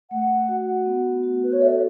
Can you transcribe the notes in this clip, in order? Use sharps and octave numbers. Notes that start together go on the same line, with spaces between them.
A3 F#5
F#4
B3
F#4
B4
C#5
A4 E5